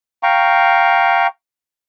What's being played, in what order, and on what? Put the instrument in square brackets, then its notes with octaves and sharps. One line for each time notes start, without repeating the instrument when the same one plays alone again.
[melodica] F5 G5 A#5 C#6